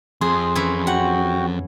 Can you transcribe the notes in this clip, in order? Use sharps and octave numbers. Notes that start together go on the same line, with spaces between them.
F2 G#4 C6
E3 C#4 E4
F#4 F#5 G5